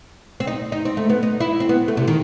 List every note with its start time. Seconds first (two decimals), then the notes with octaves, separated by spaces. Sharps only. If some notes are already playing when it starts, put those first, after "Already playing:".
0.40 C4
0.47 D#4
0.72 D#4
0.85 C4
0.97 A3
1.09 B3
1.23 D#4
1.40 E4
1.60 C4
1.69 B3
1.88 A3
1.97 C3
2.07 D#3